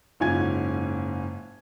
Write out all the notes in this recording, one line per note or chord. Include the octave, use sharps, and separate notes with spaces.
F#1 G#2 C#4 F4 G#5 G#6